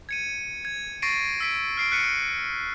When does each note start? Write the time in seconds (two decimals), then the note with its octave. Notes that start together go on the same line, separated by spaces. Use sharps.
0.09 G#6 C#7 D#7
0.65 G#6
1.02 C#6 A6 A#6 C7 D7 D#7
1.40 E6 B6 D7
1.77 F6 C7 D7
1.91 F6 F#6 B6 C#7 D#7